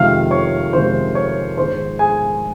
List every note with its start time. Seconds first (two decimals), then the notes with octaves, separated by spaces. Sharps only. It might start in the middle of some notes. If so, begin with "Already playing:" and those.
Already playing: F2 C3 D#3 G#3 F5 F6
0.31 C#5 C#6
0.73 F2 C3 D#3 G#3 C5 C6
1.15 C#5 C#6
1.57 A#1 G#2 D#3 G#3 C5 C6
1.99 G#4 G#5